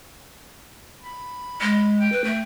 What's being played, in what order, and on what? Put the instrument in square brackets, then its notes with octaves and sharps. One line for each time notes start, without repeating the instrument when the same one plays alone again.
[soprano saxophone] B5
[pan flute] G#3 [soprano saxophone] B5
[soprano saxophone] G5
[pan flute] B4
A3